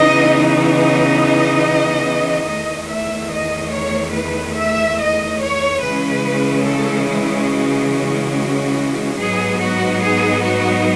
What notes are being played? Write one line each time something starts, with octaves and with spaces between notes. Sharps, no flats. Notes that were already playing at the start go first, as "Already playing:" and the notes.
Already playing: C#3 E3 B3 D#4 D#5
D#5
E2 D#3 A3 D#5
E5
D#5
C#5
B4
E5
D#5
C#5
C#3 E3 G#3 C#4 B4
A4
E4
F#4
G#2 F#3 B3 D#4 G#4
F#4
G#4
F#4